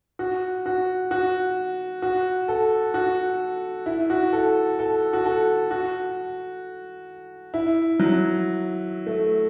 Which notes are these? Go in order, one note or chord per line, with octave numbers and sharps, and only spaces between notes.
F#4
F#4
F#4
F#4
A4
F#4
E4
F#4
A4
A4
F#4
A4
F#4
E4
F#3
A3